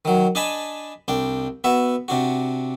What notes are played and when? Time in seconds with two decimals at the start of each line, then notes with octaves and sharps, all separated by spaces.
0.05 D#3 F#3
0.35 D4 D#5 G#5 A5 B5
1.08 C2 D4 G5
1.64 B3 F#4 E5
2.08 C3 D4 F#4